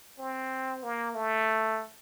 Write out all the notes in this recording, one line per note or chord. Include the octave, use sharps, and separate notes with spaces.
C4
A#3
A3